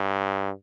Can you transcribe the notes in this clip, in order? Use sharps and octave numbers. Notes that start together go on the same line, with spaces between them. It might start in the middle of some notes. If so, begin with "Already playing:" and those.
Already playing: G2